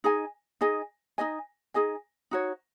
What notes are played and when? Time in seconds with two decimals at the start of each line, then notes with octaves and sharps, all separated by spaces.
0.04 D#4 G#4 D#5 G#5
0.61 D#4 G#4 D#5 G#5
1.18 D#4 G#4 D#5 G#5
1.74 D#4 G#4 D#5 G#5
2.31 D#4 F#4 C#5